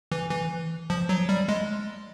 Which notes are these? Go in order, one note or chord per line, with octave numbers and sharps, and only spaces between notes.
E3
E3
F3
F#3
G3
G#3